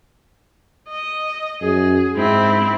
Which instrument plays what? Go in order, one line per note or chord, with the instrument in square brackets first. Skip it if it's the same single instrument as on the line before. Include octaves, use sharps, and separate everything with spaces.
[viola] D#5
[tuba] F#2 [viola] G#4
[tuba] G#2 [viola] C4 E4